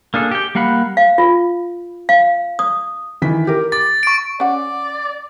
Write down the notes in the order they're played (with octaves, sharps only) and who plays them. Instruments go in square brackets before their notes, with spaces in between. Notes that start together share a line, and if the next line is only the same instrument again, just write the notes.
[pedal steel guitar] A#3 D4 G#4 A4
G4 G5
G3 A#3 F5 F#5 B5
[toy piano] F5
F4
F5
D#6
[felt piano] D#3 E3 B6
G4 A#4
[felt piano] D6 [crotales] A6
[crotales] C#6 D7
[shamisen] C#4 F#5 [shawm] D5